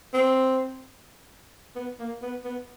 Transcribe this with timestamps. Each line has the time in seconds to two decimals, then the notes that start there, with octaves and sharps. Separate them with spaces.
0.14 C4
1.75 B3
1.99 A#3
2.22 B3
2.44 B3